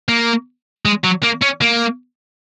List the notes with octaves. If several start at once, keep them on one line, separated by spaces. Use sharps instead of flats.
A#3
G#3
F#3
A#3
C#4
A#3